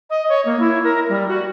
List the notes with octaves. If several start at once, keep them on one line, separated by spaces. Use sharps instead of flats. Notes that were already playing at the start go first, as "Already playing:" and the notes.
D#5
C#5
A#3
E4
A#4
G3
F#4